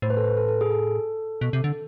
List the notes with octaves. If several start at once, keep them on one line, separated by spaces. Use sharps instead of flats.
A2 C5
B4
A4
B4
A4
A4
G#4
A4
B2
C3
D3